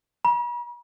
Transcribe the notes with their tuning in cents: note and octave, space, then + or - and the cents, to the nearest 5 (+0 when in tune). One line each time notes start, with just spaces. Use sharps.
B5 -45